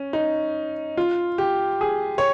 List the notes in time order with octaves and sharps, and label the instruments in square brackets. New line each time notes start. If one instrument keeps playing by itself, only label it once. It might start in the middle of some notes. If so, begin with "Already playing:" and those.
Already playing: [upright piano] C#4
D#4
F4
G4
G#4
C#5